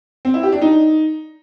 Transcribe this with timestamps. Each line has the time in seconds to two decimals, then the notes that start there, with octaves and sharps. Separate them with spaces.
0.25 C4
0.34 E4
0.43 G4
0.52 D4
0.62 D#4